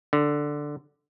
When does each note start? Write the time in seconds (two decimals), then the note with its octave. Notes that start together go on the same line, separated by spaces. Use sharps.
0.13 D3